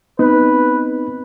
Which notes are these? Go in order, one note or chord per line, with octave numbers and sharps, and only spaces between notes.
B3 C4 D#4 B4